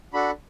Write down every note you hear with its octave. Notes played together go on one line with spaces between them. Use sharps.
D4 F#4 A4 B5